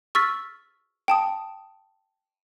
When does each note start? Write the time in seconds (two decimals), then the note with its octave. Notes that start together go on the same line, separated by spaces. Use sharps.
0.15 C#6 E6 F6 A6 B6
1.08 G5 A5 D#6